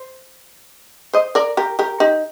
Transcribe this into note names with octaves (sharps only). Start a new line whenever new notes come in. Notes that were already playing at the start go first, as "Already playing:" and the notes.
Already playing: C5
C5 D#5
A#4 D5
G4 A#4
G4 A#4
D#4 G4